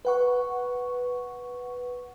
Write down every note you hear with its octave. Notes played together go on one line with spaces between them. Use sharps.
B4 F#5 C#6